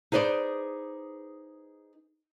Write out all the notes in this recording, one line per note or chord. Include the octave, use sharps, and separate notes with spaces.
D#4 G#4 B4 C5 D5